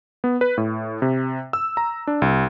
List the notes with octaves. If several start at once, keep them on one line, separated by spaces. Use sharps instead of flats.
B3
B4
A2
C3
E6
A#5
D4
C2